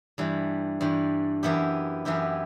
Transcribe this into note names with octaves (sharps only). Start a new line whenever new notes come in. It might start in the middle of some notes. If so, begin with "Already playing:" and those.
G2 E3 G3
G2 E3 G3
F#2 E3 B3 E4 G4
F#2 E3 B3 E4 G4